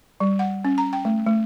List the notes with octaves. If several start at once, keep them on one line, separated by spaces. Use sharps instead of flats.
G3
F#5
C#4
A#5
G5
A3
A3